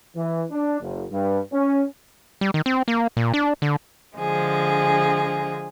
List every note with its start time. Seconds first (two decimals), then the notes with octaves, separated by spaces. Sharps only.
0.16 E3
0.50 D4
0.81 F#1
1.11 G2
1.52 C#4
2.41 G3
2.54 D#3
2.66 C4
2.88 A#3
3.17 A#2
3.34 D4
3.62 D3
4.17 D3 F3 G#3 G#4